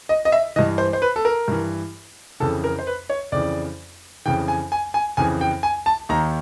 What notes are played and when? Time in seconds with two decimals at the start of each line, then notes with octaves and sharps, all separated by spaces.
0.09 D#5
0.25 D#5
0.32 E5
0.56 E3 D#5
0.59 G2
0.78 C5
0.93 C5
1.02 B4
1.16 A4
1.25 A#4
1.48 G2 E3
2.40 F2 C#3 E3 A4
2.64 A#4
2.79 C5
2.87 B4
3.10 C#5
3.32 F2 C#3 E3 D5
4.26 F2 C#3 E3 G5
4.48 G#5
4.72 G#5
4.94 G#5
5.17 F2 C#3 E3 G#5
5.41 G5
5.63 G#5
5.86 A5
6.09 D#2 D#3 A#5